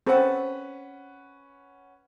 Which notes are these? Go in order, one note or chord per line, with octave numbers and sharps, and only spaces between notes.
C4 C#4 A4 B4 F#5